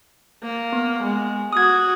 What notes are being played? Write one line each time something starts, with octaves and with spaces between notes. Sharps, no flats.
A#3
B3
G#3
F#4 D#6 G#6